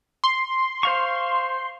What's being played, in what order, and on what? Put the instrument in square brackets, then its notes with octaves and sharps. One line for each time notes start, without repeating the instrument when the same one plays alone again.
[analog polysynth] C6
[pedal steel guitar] C5 F5 C#6